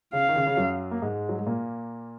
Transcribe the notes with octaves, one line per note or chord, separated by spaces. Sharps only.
C#3 F5
D#3
C#3
C#3
F#2 F#3
A#3
G#2 G#3
F#3
G#3
A#2 A#3